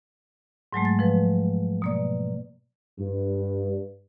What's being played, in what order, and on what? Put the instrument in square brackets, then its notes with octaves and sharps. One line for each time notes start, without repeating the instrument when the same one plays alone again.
[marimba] G#2 F#3 G#3 A3
A6
F3 B4
B2 A#3 D5
[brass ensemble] G2